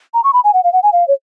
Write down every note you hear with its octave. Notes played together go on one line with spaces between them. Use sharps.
A#5
C#6
B5
G#5
F#5
F5
F#5
G#5
F5
C#5